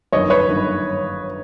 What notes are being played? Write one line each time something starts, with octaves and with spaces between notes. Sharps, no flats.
G1 F#2 D#3 C#5 D#5
B4 C#5
G1 F#2 D#3